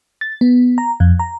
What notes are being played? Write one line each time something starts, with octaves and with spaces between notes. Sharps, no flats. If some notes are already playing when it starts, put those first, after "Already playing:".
A6
B3
A#5
F2
A#5